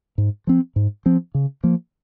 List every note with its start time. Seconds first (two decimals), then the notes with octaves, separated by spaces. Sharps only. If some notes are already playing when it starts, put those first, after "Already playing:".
0.18 G#2
0.47 F3 C4
0.76 G#2
1.06 F3 C4
1.35 C#3
1.64 F3 A#3